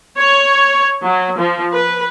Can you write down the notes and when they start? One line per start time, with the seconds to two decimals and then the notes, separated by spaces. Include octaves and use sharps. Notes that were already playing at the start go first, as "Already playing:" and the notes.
0.17 C#5
1.03 F#3
1.38 F3
1.73 B4